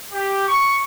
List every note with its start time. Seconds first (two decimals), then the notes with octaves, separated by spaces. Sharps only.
0.12 G4
0.47 C#6